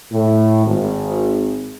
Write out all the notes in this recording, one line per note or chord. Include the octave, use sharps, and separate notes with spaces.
A2
G#1